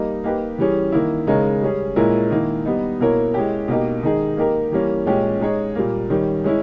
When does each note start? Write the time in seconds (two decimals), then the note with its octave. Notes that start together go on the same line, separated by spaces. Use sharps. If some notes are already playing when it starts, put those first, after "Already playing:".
Already playing: G3 A#3 D#4
0.24 A#3 D#4 G4 B4
0.58 E3 G3 C#4 G#4
0.92 D#3 A#3 E4
1.27 C#3 G#3 D#4 A#4 C#5
1.62 G3 C#4 G#4
1.96 A#2 G#3 C#4 E4 A#4
2.31 D#3 A#3 E4
2.65 G3 B3 D#4
3.00 B2 A#3 E4 A#4 C#5
3.34 G#3 C#4 E4 G4
3.68 B2 A#3 D#4 G4
4.03 D#3 G#3 D#4 G#4
4.37 A#3 D#4 G4 A#4
4.72 E3 G3 A#3 C#4
5.06 A#2 G#3 C#4 G4
5.40 G#3 D#4 G#4 C#5
5.75 A#2 G3 A#3
6.10 D#3 G3 C#4
6.44 G#3 C#4 E4